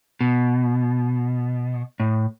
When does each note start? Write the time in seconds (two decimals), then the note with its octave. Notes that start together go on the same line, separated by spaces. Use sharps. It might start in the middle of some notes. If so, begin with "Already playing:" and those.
0.21 B2
2.00 A2